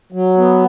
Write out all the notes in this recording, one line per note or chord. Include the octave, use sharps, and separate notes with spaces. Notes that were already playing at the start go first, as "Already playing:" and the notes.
F#3
B3